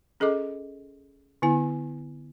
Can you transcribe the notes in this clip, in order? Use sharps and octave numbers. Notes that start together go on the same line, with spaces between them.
C#4 G#4 A4 D#5 D6
D3 B3 E4 G#5